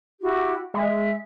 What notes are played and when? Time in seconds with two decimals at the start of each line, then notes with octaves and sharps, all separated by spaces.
0.21 E4 F#4 G4
0.74 G#3 E5